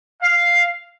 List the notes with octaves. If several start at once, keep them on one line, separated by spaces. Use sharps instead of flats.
F5